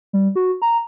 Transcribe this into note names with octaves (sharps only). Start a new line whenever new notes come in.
G3
F#4
A#5